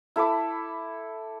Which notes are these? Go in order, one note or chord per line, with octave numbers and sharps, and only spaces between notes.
E4 A4 B5 D6